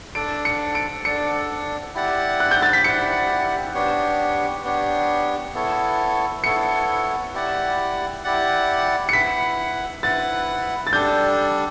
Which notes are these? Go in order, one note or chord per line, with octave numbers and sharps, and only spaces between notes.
D4 A4 D5 D7
C#7
D7
D4 A4 D5 C#7
E4 G4 D5 F#5
F#6
G6
A6
B6
E4 G4 D5 F#5 C#7
B3 D4 G4 C#5
B3 D4 G4 C#5
B3 E4 A4 C#5
B3 E4 A4 C#5 C#7
E4 G4 D5 F#5
E4 G4 D5 F#5
C#7
E4 B4 F#5 B6
E4 B4 F#5 A6
A6
G3 D4 A4 G6